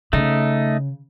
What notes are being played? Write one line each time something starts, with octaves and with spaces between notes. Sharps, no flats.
C#3 A3 D#4